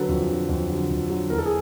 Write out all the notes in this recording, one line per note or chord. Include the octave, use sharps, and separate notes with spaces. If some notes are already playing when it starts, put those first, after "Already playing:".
Already playing: D3 F#3 A4 B4
F2
D3 F#3
F2
D3 F#3
F2
D3 F#3
E2 A#4
A4
G#4